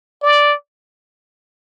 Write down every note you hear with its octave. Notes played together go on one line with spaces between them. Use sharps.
D5